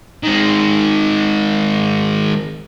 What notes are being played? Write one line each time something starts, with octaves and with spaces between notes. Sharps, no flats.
D#3 G#3